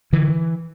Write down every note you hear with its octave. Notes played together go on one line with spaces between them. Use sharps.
D3 E3